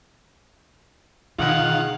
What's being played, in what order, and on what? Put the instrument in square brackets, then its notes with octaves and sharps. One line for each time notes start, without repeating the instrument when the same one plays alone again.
[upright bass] B2 [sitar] D3 D#4 G#4 [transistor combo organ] D#3 F4 [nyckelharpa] F5 F#5